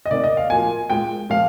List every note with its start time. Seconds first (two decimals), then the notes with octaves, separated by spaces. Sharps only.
0.06 D#5
0.11 C3 D#3 A#3 D5
0.24 D#5
0.37 F5
0.50 A#2 F3 A#3 G#5
0.90 A#2 G#3 G5
1.30 A#2 F3 G#3 F5